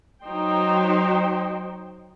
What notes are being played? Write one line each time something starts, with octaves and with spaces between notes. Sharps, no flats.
F#3 D#4 C5 G5